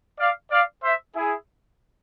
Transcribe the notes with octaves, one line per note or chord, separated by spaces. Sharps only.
D5 F5
D5 F5
C5 E5
E4 G#4